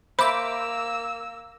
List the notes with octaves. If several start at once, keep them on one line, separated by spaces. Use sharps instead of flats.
A#3 C5 E5 B5 D6 E6